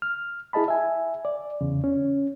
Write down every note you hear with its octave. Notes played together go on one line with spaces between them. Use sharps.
F6
E4 G#4 D#5 A5 B5
E5 G#5
D5
E2 C#3
C#4